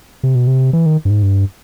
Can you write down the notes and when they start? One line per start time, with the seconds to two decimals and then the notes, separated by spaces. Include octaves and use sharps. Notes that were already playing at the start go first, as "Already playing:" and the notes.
0.23 C3
0.35 B2
0.47 C3
0.73 E3
0.86 D#3
1.05 G2
1.10 G#2
1.23 G2